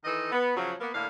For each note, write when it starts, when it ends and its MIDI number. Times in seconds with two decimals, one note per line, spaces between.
0.05 0.32 51
0.05 0.32 52
0.05 0.32 69
0.05 0.32 75
0.32 0.56 59
0.56 0.73 49
0.56 0.73 53
0.56 0.73 54
0.81 0.92 58
0.81 0.92 59
0.94 1.08 45
0.94 1.08 50
0.94 1.08 58
0.94 1.08 77